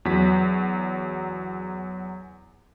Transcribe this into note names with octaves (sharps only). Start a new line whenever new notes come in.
E2 F#3 B6